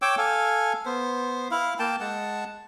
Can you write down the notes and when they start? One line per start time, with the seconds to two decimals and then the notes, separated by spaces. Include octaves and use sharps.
0.02 C#5 G5 D6 E6
0.18 A4 F5 G#5
0.86 B3 C5
1.51 E4 F5
1.79 A#3 G5 A5
2.00 G#3 F#5 A5